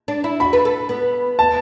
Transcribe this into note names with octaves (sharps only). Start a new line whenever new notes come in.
D4
E4
F#4 B5
B4
A4
B3
A5